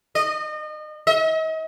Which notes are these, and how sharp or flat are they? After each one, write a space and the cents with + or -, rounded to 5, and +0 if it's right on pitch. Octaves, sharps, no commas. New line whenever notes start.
D#5 -30
D#5 +40